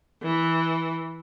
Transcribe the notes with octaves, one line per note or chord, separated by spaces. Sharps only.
E3